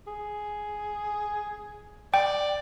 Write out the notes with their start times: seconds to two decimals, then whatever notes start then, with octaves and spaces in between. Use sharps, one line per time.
0.07 G#4
2.14 D5 G5